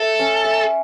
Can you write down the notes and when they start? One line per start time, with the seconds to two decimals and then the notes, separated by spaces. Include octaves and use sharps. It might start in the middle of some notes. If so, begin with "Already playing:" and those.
Already playing: A4 E5
0.19 C#4
0.44 E5